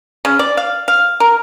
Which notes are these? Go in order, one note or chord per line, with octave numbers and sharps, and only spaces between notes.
C#3
D5
F5
F5
A#4